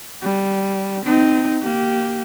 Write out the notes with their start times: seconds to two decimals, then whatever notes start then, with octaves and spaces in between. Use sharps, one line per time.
0.22 G3
1.06 C4 D#4
1.62 A#3 G4